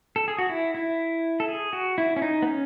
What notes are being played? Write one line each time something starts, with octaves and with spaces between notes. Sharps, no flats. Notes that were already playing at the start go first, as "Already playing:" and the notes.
A4
G#4
F#4
E4
E4
A4
G#4
F#4
E4
C#4
D#4
B3
C#4